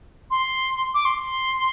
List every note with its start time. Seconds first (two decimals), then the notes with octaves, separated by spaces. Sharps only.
0.31 C6
0.94 D6
1.05 C6